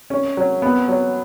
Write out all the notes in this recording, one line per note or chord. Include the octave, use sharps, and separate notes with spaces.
C#4
F#3
B3
F#3